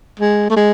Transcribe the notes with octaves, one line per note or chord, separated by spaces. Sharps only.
G#3
A3
G#3